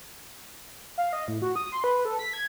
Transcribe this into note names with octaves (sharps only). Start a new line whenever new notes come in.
F5
D#5
A2
F#4
D#6
C6
B4
A4
B6
G#6